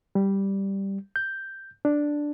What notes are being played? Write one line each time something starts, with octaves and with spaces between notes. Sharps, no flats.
G3
G6
D4